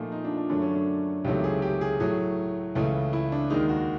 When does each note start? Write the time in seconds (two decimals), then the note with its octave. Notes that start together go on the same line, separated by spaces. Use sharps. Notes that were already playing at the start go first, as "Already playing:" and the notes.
Already playing: A#2 F3 A3 D#4
0.12 D#4
0.25 D4
0.37 D4
0.49 F#2 D3 F#3 A3 D4
0.62 C#4
0.75 D4
1.24 C#2 C3 D#3 F#3 A3 G4
1.44 G#4
1.62 G4
1.81 G#4
2.00 A2 F#3 A3 G#4
2.75 C#2 C#3 E3 A3
3.13 E4
3.32 D4
3.50 D#2 D#3 G#3 D#4
3.69 F#4